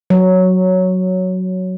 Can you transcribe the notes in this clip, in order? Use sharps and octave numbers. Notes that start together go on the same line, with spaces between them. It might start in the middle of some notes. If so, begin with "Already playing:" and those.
F#3